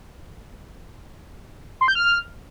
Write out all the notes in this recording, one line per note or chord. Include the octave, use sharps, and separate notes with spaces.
C6
G6
F6